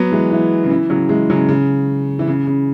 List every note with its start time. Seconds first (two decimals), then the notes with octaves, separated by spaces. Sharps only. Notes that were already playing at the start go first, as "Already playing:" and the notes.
Already playing: F#3 B3
0.12 E3 G#3
0.32 E3
0.64 C#3
0.70 E3
0.90 C#3 F#3
1.09 E3 G#3
1.30 C#3 F#3
1.49 C#3
2.19 E3
2.27 C#3
2.47 C#3